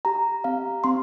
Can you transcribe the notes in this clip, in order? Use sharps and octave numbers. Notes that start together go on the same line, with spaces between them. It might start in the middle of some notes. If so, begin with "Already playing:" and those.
G4 A#5
C4 F5
C4 C6